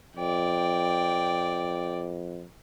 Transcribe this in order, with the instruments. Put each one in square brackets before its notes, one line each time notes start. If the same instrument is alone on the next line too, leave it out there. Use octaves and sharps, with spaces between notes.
[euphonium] F2 [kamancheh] D5 G5